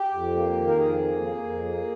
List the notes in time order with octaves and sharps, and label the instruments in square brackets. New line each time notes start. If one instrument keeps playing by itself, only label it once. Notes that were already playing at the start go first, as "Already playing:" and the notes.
Already playing: [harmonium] G4
F2
A#3
D#3
A#4
F2 G#4
A#3
A#3
F2
A#3